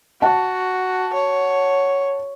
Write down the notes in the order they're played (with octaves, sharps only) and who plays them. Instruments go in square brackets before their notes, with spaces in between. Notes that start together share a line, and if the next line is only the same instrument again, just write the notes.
[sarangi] F#4 [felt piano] F#5 A5
[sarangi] C#5